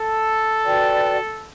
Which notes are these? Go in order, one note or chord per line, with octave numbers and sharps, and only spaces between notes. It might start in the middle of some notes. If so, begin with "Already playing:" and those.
Already playing: A4
F#4 B4 D5 G5